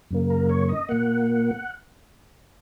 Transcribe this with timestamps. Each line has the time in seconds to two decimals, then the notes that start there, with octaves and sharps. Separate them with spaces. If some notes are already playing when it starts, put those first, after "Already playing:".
0.11 F#2 C#3 A#3
0.30 A#4
0.49 C#5
0.69 D#5
0.89 A#2 A#3 F#5